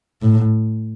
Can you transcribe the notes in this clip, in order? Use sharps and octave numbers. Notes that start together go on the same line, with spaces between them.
A2